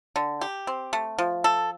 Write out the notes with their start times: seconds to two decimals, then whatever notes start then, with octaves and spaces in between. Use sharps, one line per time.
0.16 D3
0.41 G4
0.67 C4
0.93 A3
1.18 F3
1.44 A4